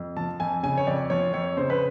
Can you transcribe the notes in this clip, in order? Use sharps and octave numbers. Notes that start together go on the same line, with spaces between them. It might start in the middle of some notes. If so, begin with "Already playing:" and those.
Already playing: F2
F3 A5
F2 G#5
C#3 G#5
C#5
F2 D5
F3 C#5
F2 C#5
C#3 C5
B4